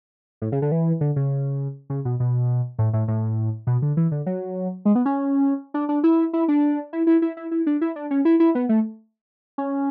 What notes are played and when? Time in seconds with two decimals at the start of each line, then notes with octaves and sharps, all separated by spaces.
0.42 A2
0.52 C#3
0.62 D3
0.72 E3
1.01 D3
1.16 C#3
1.90 C#3
2.05 B2
2.20 B2
2.79 A2
2.93 A2
3.08 A2
3.67 B2
3.82 D3
3.97 E3
4.11 D3
4.26 F#3
4.85 G#3
4.95 B3
5.06 C#4
5.74 D4
5.89 D4
6.04 E4
6.33 E4
6.48 D4
6.93 E4
7.07 E4
7.22 E4
7.37 E4
7.51 E4
7.67 D4
7.81 E4
7.96 D4
8.11 C#4
8.25 E4
8.40 E4
8.55 B3
8.69 A3
9.58 C#4